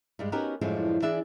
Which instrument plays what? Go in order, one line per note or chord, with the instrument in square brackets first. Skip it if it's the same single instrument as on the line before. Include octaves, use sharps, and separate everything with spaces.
[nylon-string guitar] G2 G3 G#3
B3 C#4 D#4 F#4 G4 A#4
F#2 A2 D3 F3 G#3 D4
E3 D4 G#4 D5 E5